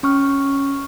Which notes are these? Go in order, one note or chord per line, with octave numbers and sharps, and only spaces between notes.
C#4 C#6 F6